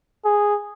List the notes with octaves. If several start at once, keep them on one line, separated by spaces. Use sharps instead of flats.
G#4